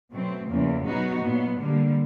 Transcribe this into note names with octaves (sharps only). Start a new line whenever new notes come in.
B2 F#3 A3 C4
E2 C#3 F3 A#3
B2 F#3 B3 D#4 F#4
A#2 F#3 B3
D3 G3 A#3